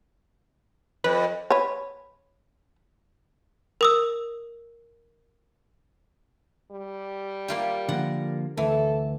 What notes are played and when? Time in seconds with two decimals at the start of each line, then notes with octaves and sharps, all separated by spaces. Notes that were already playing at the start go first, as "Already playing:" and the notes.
1.04 F2 B4
1.51 B4 C#5
3.81 A#4 D#6 E6
6.72 G3
7.48 A#3 F4 G4
7.89 D3 F3 A#3 F#5
8.57 D2 E3 A4